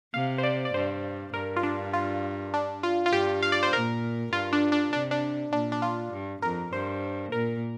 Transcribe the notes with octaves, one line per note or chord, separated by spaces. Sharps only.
C3 F5
C5
D5
D5
G2 C5
G2 A#4
F4
D4
F4
D4
F4
F4
G2 G4
F5
D5
C5
A#2 A#4
G2 F4
D4
D4
C3 D4
D4
A#2 D4
D4
F4
G2
F2 A#4
G2 C5
A#2 A#4